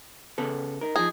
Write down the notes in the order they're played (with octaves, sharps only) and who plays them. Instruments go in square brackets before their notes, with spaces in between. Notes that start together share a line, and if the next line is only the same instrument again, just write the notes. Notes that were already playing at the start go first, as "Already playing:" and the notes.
[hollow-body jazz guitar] C#3 B3 A4
D#4 A#4
[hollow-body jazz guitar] F3 D#4 [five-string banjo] G#4